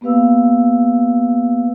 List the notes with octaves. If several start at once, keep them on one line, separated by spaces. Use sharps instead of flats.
A#3 B3 G4 B4 F5 E6